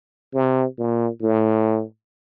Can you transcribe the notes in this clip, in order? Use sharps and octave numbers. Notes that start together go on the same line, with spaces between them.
C3
A#2
A2